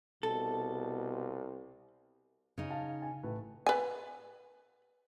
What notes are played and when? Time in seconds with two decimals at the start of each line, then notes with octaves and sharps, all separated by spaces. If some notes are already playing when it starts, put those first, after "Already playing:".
0.23 C2 B2 A4
2.58 C#3 D#4
2.70 F5 A5
3.02 G#5
3.23 A1 A3 B4
3.67 B4 G#5